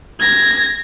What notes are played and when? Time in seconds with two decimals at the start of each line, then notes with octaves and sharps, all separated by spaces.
0.20 G#6 A#6